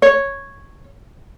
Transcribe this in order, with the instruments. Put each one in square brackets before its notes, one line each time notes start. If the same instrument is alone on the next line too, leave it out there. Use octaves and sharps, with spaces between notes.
[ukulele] C#5